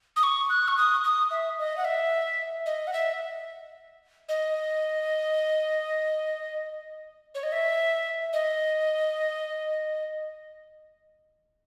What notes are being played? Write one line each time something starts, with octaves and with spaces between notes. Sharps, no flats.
D#6
C#6
F#6
C#6
D#6
D#6
E5
D#5
F#5
E5
D#5
F#5
E5
D#5
C#5
D#5
E5
D#5